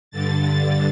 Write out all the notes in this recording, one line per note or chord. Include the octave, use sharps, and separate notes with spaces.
G2 D3 A6